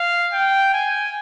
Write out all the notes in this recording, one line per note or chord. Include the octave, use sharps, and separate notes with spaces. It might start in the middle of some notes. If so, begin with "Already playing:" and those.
Already playing: F5
G5
G#5